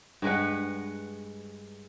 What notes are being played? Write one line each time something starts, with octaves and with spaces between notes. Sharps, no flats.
G2 G#3 B4 F#5